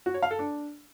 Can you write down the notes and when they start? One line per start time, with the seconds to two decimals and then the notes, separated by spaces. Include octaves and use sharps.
0.06 F#4
0.14 C#5
0.23 F5
0.31 A4
0.39 D4